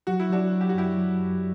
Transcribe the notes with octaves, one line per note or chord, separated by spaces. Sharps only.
F#3 F#4
E4
F#3 D4 F#4
F#3
G4
F#4
F#2 E4 G4
F#3
F#2